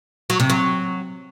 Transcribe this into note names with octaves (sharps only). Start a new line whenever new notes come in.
F#3
C3
F#3